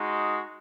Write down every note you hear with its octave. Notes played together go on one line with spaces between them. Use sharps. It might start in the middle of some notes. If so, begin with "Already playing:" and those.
Already playing: G#3 D#4 F#4